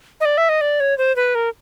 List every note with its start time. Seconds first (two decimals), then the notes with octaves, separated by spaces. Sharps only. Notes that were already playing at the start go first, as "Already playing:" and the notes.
0.20 D#5
0.25 D5
0.38 E5
0.49 D#5
0.61 D5
0.80 C#5
0.98 C5
1.16 B4
1.35 A#4